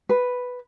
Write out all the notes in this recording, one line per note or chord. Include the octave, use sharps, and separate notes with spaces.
B4